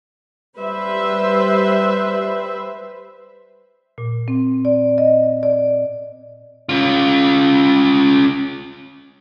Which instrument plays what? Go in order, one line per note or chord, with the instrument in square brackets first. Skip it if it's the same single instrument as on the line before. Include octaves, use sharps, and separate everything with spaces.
[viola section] G3 B4 C5 E5
[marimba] A#2
C4
D5
D#5
D5
[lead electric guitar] C#4 F4